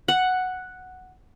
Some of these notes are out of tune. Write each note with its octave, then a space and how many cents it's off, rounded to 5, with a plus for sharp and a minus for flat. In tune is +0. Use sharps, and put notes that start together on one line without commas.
F#5 +0